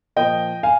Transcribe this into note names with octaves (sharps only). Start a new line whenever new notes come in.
A#2 F3 A#3 D#5 G5
F5 G#5